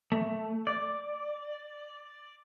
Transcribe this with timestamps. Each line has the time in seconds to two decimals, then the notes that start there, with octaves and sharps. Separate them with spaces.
0.12 A3
0.67 D5